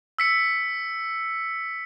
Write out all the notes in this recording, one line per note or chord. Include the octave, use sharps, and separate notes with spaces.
E6 B6 C#7